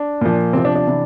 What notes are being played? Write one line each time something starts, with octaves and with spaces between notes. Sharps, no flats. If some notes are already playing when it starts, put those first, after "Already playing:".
Already playing: D4
A#2 F3
C3 F3 C4
D4
D4
C3 E3